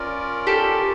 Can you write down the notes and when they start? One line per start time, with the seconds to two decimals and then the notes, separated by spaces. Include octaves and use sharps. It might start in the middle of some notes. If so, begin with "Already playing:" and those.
Already playing: C#4 F4 A#4 D5
0.47 G4 A4